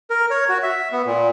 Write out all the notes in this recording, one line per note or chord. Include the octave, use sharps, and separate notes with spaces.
A#4
C#5
F#4
E5
B3
A#2